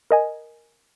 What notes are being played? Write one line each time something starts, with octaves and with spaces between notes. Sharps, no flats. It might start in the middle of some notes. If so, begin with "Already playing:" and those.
A#4 D#5 G#5